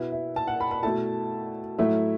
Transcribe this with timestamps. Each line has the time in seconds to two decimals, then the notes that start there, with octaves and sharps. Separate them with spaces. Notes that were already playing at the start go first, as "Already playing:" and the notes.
Already playing: B2 B3 E4
0.12 E5
0.36 A5
0.47 F#5
0.61 B5
0.71 B5
0.83 B2 A3 E4 A5
1.78 A2 F#3 A3 E4 E5